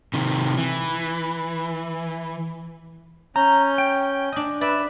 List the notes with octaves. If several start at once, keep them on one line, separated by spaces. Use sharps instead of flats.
C3 D#3
E3
C#4 A#5 G6
G5
D4 D#5
B4 D5 E5